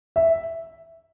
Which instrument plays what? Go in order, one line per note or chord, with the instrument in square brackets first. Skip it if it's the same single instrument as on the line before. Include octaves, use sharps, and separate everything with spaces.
[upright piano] E5